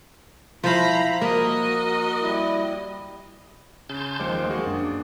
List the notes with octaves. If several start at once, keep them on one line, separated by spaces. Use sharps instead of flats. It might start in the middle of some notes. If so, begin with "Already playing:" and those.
F3 E4 C5 F5 A#5 B5
A#3 F#4 A#4 D#5
G3 E4
C#3 A5 C6 G6
D#2 F3 G#3 C5 D6
A#3 F#4 G#4
F#2 D4
D6